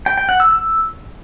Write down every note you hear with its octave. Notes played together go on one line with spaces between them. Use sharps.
G5
G5
F#5
E6
E6